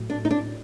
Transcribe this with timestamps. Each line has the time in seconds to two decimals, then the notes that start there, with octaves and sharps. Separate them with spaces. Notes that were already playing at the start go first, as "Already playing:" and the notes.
Already playing: A2 F#3 A3
0.10 D4
0.25 D#4
0.31 D4